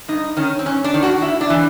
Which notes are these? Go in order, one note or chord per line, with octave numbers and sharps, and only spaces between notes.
G2 D#4
D#3 C#4
C4
G2 C#4
D4
D#3
F#4
A2 E4
D4
E3